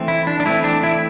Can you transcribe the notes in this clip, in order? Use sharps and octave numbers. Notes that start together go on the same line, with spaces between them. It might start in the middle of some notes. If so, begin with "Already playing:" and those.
Already playing: E3 A3 C4
E4
D4
D4
E3 A3 C4 E4
D4
E4